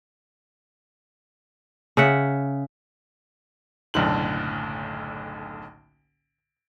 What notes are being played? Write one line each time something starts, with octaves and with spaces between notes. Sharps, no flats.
C#3 E5 F#5
F#1 B1 A2 D3 F#7